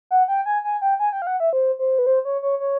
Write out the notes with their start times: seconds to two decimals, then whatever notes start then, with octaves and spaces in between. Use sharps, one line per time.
0.11 F#5
0.28 G5
0.46 G#5
0.64 G#5
0.82 G5
1.00 G#5
1.13 G5
1.22 F5
1.27 F#5
1.40 E5
1.53 C5
1.79 C5
1.99 B4
2.06 C5
2.25 C#5
2.42 C#5
2.60 C#5